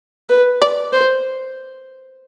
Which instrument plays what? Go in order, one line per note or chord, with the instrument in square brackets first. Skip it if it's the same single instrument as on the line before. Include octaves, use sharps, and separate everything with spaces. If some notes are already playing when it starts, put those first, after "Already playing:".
[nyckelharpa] B4
[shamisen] D5
[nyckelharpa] C5